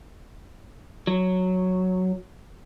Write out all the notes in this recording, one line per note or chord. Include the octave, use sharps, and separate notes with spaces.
F#3